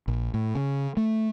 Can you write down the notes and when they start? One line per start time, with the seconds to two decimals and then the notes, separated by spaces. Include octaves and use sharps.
0.08 A#1
0.34 A2
0.55 C#3
0.97 A3